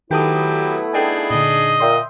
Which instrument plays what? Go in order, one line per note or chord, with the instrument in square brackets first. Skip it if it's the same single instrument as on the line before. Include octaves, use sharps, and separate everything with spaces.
[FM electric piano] D#3 A4 D#6 [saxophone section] F#3 G4 [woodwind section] A3 B3 E4
[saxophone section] D4 D#4 G#4 [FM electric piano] A4 G5 G#5
[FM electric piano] A#2 D3 [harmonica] D#5
[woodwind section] A#2 [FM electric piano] E5 G5 C6